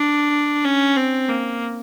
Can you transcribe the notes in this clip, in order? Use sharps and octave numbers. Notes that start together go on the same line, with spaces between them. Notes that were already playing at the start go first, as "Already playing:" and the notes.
Already playing: D4
C#4
C4
A#3